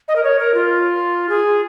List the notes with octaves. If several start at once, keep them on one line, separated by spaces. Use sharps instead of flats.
D#5
A#4
C#5
A#4
F4
G#4